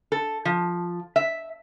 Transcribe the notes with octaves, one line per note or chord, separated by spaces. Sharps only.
A4
F3
E5